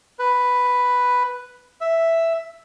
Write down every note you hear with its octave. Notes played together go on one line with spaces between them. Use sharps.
B4
E5